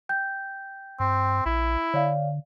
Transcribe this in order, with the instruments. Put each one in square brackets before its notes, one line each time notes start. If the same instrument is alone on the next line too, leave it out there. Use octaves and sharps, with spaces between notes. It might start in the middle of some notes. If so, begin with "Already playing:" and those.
[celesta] G5 G6
[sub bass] G2 [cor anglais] C4
[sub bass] A#1 [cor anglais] E4
[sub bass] D3 [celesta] C#5 D5 F5